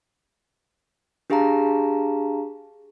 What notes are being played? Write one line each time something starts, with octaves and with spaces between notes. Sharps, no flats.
D4 G4 G#4 F5 A5 A#5